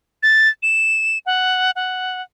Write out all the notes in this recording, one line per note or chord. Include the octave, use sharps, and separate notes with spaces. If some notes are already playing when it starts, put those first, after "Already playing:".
A6
E7
F#5
F#5